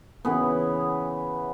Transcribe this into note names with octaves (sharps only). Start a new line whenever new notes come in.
C#3 E3 B3